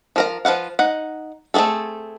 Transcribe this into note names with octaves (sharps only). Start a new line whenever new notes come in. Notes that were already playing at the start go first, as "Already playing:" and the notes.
F3 A#4 A#5
F3 B4 F5 F#5
D#4 F#5
A3 C4 F#4 G#4 A4